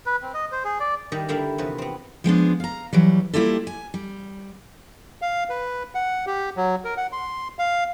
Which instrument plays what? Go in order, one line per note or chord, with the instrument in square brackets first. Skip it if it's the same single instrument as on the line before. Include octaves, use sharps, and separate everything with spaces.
[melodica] B4
C4
D#5
C5
G#4
D5
[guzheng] D#3 G3 D#5 E5 A5
D3 G3 A#3 E4 E5 F5
E2 C3 F3 B4
B3 C4
[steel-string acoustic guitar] F3 G#3 B3 D4
F5 A#5
E3 F#3 G3
G3 A#3 E4 F4 G4 A4
G#5
G3
[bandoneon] F5
B4
F#5
G4
F#3
A#4
F#5
C6
F5